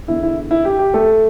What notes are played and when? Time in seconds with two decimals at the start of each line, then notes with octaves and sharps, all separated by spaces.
0.08 E2 D3 E4
0.23 E4
0.51 E4
0.65 G4
0.79 G4
0.94 A3 A4